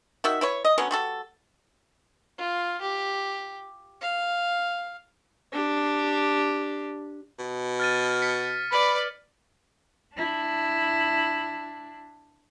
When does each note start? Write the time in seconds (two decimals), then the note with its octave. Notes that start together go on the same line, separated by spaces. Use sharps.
0.24 D#3 F#4 E5
0.41 E4 B4 C#5
0.65 D#5
0.78 D3 F#3 B3 C#4
0.91 G3 F#4 A4
2.38 F4
2.81 G4
4.01 F5
5.52 D4 G4
7.39 B2
7.80 F6 A6 D#7
8.22 B6 C#7
8.72 B4 D5 B5
10.15 D4 E4